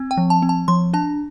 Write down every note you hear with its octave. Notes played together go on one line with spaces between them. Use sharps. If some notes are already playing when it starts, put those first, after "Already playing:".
Already playing: C4
G5
F3
A5
C4
A5
F3 C6
D4 A5